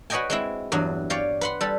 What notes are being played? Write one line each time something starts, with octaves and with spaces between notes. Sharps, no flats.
F#4 B4 C#5 D#5 G5 G#5
G#3 C4 E4
E2 G2 F#3
C#5 D5 F5 G5
B4 F#5 C6
G3 A4